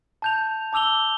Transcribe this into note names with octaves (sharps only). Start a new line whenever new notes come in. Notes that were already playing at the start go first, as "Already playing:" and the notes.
A5 G6 F7
A5 D6 E6 F7 G7